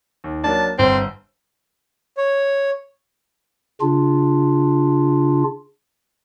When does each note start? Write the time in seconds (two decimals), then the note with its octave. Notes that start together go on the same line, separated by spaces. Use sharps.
0.24 D#2
0.44 F#3 A#3 D4 A5
0.79 G1 C4 C5
2.17 C#5
3.81 C#3 D4 F4